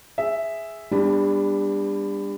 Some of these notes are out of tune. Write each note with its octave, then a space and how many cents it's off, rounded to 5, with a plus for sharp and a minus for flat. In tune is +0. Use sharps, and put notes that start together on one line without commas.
G#4 +0 E5 +0
G3 +35 B3 +0 D4 +0